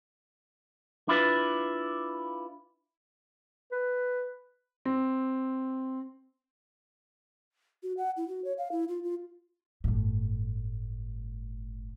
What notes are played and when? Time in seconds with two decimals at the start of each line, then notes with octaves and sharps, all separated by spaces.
1.08 D4 E4 F4 B4
3.72 B4
4.85 C4
7.83 F#4
7.97 F#5
8.17 E4
8.28 F#4
8.44 C#5
8.58 F5
8.72 E4
8.88 F4
9.03 F4
9.84 G1 A2